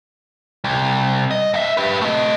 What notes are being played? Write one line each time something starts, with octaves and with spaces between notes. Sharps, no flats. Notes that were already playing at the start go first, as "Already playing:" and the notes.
C2
D#5
G2 E5
G4 B4
A3 D#5